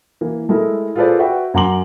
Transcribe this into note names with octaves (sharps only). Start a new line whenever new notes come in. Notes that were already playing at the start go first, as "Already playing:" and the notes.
E3 A#3
G#3 A3 E4 A4 A#4
F4 G#4 A4 B4 C5 D5
F#4 B4 E5 G5
F#2 F#5 A#5 C6 D6 F#7